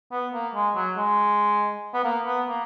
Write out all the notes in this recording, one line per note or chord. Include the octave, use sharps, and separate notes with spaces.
B3
A#3
G#3
F#3
G#3
B3
A#3
B3
A#3